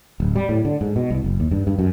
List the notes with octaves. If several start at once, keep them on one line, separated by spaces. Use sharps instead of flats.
D1
G3
A2
D3
G#2
B2
C2
F#1
D#2
G2
G2
F#2